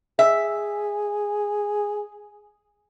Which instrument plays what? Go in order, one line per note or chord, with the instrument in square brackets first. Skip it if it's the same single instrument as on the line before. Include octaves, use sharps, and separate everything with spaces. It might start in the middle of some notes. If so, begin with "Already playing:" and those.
[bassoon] G#4 [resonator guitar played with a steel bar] E5